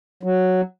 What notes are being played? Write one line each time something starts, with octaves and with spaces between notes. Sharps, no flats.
F#3